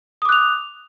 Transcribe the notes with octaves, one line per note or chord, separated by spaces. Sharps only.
D6 D#6 F#6 F7